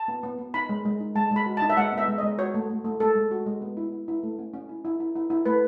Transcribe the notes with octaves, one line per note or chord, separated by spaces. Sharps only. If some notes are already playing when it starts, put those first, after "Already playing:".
Already playing: A5
B3
B3
B3
D#4 B5
G#3
G#3
D#4
G#3 A5
G#3 B5
F#4
D#4 A5
E5
G#3 F#5
B3
E5
G#3
G#3 D#5
F#4 C#5
A3
A3
A3
G#3 A4
G#3
F#4
G#3
B3
E4
E4
E4
A3
C#4
C#4
E4
E4
E4
E4
E4
A3 B4